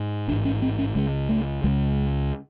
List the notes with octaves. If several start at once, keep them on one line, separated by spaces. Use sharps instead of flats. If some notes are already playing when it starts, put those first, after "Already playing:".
Already playing: G#2
A1 G#2 D4
C#4
C4
C#4
C#2 C#3 G#3
A3
C#2 C#3 G#3